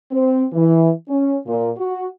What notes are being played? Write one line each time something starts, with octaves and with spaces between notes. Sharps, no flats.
C4
E3
C#4
A#2
F#4